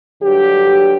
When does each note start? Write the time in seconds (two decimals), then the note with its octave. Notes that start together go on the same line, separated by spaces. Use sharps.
0.21 G2 D3 F#3 G4